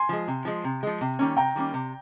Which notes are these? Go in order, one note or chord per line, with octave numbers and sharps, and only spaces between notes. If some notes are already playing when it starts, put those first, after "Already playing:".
Already playing: G#5 C6
F3 G#3
C3
F3 G#3
C3
F3 G#3
C3
D#3 G3 A#3 C#4
C3 G5 A#5
D#3 G3 A#3 C#4
C3